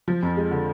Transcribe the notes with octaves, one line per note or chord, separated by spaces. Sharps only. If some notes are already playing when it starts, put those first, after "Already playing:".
F3
F2
G#3
D3